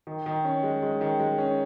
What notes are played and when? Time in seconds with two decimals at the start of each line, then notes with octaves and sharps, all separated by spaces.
0.07 D#3
0.26 D#3
0.45 C#4
0.63 G#3
0.82 G#3
1.01 D#3
1.20 G#3
1.38 C#4